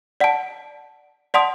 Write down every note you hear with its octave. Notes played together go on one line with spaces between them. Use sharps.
D5 F#5 A5
D5 F#5 A5 C6 D#6